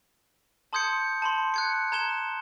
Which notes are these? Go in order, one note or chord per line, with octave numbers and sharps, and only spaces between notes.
A5 C6 D#6 G6 G#6 C#7
A5 B5 C6
F#6 G#6 C#7
A#5 G#6 E7 G7